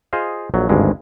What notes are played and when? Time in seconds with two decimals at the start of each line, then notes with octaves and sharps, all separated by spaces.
0.13 F4 G#4 C5 D#5 F5
0.54 A#1 F#3
0.69 G#1 D2 G2 G#3